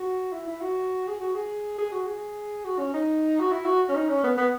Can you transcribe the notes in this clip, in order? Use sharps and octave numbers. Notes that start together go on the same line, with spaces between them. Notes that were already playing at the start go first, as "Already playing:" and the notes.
Already playing: F#4
E4
E4
F#4
G#4
F#4
G#4
G#4
F#4
G#4
F#4
C#4
D#4
F#4
E4
F#4
C#4
D#4
C#4
B3
B3